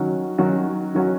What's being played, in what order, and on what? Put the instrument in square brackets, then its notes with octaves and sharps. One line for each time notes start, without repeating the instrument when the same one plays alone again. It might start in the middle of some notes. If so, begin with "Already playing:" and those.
Already playing: [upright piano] D#3 F#3 C#4 F#4
D#3 F#3 C#4 F#4
D#3 F#3 C#4 F#4